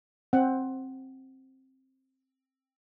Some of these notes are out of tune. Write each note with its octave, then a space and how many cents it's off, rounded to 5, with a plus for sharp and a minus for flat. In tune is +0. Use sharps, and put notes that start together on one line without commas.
C4 +15 F#5 +10